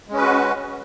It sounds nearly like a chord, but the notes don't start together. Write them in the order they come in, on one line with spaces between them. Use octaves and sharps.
G#3 C#4 B4 F#4